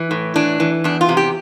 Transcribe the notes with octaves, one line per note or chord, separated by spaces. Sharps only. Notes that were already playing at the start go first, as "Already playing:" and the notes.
Already playing: E3
A2
E3 D4
E3
E2 D4
F4
C3
G4